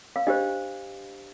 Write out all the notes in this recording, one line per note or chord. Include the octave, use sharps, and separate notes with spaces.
F5
D4 G4 C5 D#5